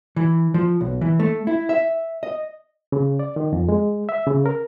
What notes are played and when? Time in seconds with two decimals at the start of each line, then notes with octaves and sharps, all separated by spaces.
0.16 E3
0.54 F3
0.81 B1
1.01 E3
1.20 A3
1.47 E4
1.69 E5
2.23 D#5
2.92 C#3
3.19 D5
3.36 D#3
3.53 F2
3.69 G#3
4.09 E5
4.27 C#3
4.46 A#4